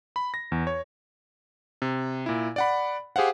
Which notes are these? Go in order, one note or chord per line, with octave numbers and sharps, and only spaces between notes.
B5
A#6
E2
C#5
C3
A#2 E4
D5 F#5 B5
G4 G#4 C5 F5 F#5